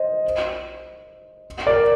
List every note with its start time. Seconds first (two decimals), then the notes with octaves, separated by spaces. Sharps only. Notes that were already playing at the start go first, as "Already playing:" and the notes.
Already playing: C5 D#5
1.67 A#4 D5